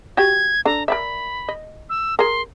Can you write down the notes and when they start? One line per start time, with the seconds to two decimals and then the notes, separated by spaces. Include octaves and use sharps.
0.17 F#4 G4 G#6
0.65 D4 A4 A#5
0.88 A#4 D5 E5 B5
1.49 D#5
1.90 E6
2.19 G#4 A#4 C6